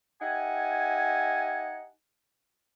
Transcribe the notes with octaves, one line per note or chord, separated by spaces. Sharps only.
D#4 G4 E5 F#5 G#5